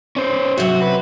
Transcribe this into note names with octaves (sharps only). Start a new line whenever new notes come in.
C#4 C5
C3 F#3 F#4
B4